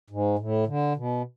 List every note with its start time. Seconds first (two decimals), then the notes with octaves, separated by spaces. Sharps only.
0.10 G#2
0.39 A2
0.68 D3
0.97 B2